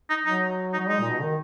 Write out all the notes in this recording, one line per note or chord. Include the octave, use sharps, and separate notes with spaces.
D#4
F#3 D#4
D#4
F#3
G#3 D#4
A#2
B2
D#3